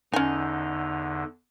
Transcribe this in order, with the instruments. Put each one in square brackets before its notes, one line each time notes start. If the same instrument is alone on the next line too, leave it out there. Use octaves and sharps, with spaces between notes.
[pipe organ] E2 D3 [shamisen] C#4 G#5 [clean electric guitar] D#4